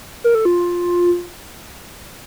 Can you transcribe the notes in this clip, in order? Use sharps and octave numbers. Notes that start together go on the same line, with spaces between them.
A#4
A4
F4